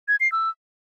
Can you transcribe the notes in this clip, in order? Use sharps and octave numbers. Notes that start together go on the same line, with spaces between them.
G#6
C7
E6